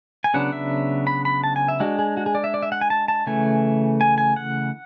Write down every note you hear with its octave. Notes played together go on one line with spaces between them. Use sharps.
G#5
C#3 F#3 B3 D4 F#5
E5
B5
B5
A5
G#5
E5
G#3 D4 F#4
G#4
F#4
G#4
D5
E5
D5
E5
F#5
G#5
A5
A5
C#3 E3 A3 G#5
G#5
G#5
F#5